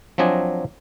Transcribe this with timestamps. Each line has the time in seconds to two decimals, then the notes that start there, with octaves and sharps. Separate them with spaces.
0.18 F3 F#3 C4 D4 D#5 G#5